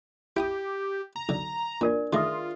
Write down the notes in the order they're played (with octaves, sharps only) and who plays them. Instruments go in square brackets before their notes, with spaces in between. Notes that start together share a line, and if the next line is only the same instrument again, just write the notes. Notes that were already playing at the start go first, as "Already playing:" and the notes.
[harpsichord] E4 G5 D#6 [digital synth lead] G4
[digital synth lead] A#5
[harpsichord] B1 D3
[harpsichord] A#2 [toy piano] D4 A#4 D5
[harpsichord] D#3 A3 [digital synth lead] F4 [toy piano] G#4 E5 D#6